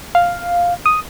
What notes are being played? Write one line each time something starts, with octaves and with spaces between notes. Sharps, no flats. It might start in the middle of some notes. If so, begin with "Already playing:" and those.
F5
D#6